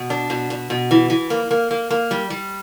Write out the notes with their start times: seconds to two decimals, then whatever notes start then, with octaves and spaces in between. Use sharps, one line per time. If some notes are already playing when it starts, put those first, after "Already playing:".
Already playing: B2
0.10 D4
0.30 B2
0.50 B2
0.70 B2
0.91 E3
1.10 E3
1.30 A#3
1.51 A#3
1.71 A#3
1.90 A#3
2.11 G3
2.30 G3